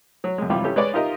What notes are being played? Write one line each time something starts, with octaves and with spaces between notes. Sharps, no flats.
F#3
F#2 G#3
G#1 C3 E3 G3 F4 B5
C#4 E4 G4 A4
G#3 B4 C#5 D5
D#4 F4 G4 A#4 D#5 E5